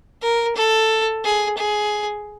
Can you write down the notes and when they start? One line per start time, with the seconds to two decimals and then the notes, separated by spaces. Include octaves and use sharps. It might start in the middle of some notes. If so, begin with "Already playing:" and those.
0.23 A#4
0.57 A4
1.25 G#4
1.58 G#4